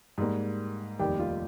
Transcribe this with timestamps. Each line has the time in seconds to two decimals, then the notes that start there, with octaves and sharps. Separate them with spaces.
0.18 G#2 G3 A#3
0.99 F1 D#2 D#3 G3 G4
1.19 F4